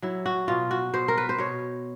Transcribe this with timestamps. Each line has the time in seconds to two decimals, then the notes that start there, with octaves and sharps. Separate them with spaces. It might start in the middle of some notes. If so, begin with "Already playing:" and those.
0.02 F#3 E4
0.26 F#4
0.48 B2 F4
0.71 F#4
0.94 B2 C5
1.08 A#4
1.18 B4
1.29 C5
1.38 B2 C#5